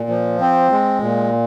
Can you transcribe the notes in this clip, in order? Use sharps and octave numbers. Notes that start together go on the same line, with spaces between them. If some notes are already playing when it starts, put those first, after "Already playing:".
Already playing: A#2
F3
C4
G#3
A#2